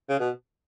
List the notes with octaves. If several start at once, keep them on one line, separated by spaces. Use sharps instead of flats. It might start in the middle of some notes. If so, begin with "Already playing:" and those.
C#3
B2